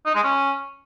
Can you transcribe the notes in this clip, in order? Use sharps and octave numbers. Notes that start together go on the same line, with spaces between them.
D#4
G#3
C#4